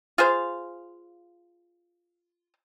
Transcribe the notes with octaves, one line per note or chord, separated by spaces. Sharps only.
F4 G#4 C5 F5